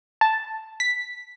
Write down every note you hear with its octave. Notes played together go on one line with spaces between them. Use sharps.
A5
B6